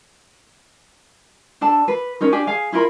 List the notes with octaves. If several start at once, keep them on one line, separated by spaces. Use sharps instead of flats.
D4 A4 A5
B4
C#4 D#4 A#4
D4 G4 G#5
G#4 F5 G#5
E4 F4 A#4 B5